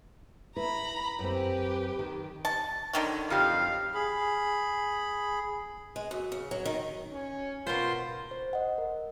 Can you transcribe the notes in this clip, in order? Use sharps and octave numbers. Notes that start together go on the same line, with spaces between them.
E4 B4 A#5 B5
F#2 C4 G4 B4
D#3
A5
D3 D#3 F#3
F2 F3 G4 F5
G#4 B5
G#3
F#2
C#3
F#3
D#3
C#4
B2 F4 A#4 C5 C6
C5
D#5 F#5
A#4